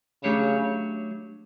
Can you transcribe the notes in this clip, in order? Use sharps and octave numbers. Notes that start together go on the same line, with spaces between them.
C#3 F#3 A3 D4 G4 C#5